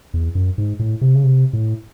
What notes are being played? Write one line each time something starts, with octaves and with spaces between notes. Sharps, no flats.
E2
F#2
G#2
A2
C3
C#3
C3
A2